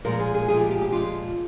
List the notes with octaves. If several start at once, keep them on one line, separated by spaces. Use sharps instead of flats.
A#2 F3 G#3 A#4
G#4
G#4
A#2 F3 G#3 G#4
G4
G4
G4
A#2 F3 G#3 F4